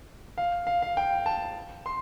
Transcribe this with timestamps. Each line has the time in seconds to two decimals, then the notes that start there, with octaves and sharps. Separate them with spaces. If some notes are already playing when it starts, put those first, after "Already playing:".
0.38 F5
0.67 F5
0.82 F5
0.97 G5
1.26 A5
1.86 C6